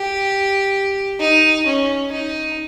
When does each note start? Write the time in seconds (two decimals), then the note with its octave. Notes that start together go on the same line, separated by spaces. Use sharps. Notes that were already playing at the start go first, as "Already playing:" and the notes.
Already playing: G4
1.20 D#4
1.66 C#4
2.12 D#4